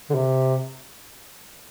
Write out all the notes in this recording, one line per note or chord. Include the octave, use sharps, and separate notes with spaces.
D3
C3